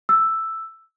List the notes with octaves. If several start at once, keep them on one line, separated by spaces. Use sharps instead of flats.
E6